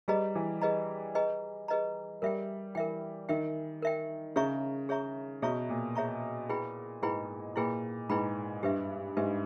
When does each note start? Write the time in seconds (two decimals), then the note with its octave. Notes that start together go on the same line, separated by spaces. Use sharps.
0.08 G3 G#4 B4 D#5 A#5
0.35 E3
0.61 G#4 B4 D#5 A#5
1.15 G#4 B4 D#5 A#5
1.68 G#4 B4 D#5 A#5
2.22 G3 A#4 E5 G5
2.75 E3 A#4 E5 G5
3.29 D#3 A#4 E5 G5
3.82 A#4 E5 G5
4.36 C#3 G#4 C#5 E5 A#5 C#6
4.89 G#4 C#5 E5 A#5 C#6
5.42 B2 G#4 C#5 E5 A#5 C#6
5.69 A#2
5.95 G#4 C#5 E5 A#5 C#6
6.49 E4 G#4 B4 G5 B5
7.02 G#2 E4 G#4 B4 G5 B5
7.56 A#2 E4 G#4 B4 G5 B5
8.09 G#2 E4 G#4 B4 G5 B5
8.63 G2 G4 B4 E5
9.17 G#2 G4 B4 E5